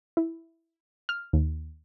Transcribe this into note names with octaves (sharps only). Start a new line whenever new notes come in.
E4
F6
D#2